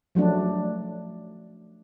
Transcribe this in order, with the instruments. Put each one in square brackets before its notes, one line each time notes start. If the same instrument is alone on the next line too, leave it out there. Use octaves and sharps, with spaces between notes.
[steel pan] F3 F#3 A3 D4